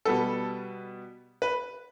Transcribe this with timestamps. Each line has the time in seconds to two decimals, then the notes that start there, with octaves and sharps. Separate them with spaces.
0.05 B2 G3 B3 A4
1.42 B4